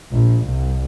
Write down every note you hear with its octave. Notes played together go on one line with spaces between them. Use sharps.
A#1
C2